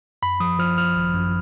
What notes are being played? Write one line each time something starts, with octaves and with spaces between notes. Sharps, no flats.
F#2 B5
F3 D#6
F3 F6
F3 F6
G#1
F#2